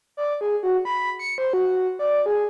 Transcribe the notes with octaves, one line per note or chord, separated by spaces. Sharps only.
D5
G#4
F#4
B5
C#7
C5
F#4
D5
G#4